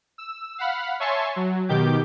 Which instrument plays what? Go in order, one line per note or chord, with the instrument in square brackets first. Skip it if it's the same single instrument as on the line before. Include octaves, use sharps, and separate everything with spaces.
[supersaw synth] E6
F5 F#5 B5 F6
C#5 E5 G#5 A5 C6 C#6
F#3
B2 D#3 G4 D6 G6